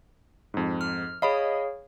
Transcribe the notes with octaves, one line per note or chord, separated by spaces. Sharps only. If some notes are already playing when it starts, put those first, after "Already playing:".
F2 G#2
F6
G#4 C#5 D#5 F5 B5